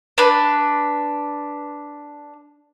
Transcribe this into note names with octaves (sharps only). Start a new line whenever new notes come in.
D4 B4